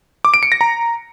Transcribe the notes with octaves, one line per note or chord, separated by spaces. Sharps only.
D6
D7
C#7
A#6
A#5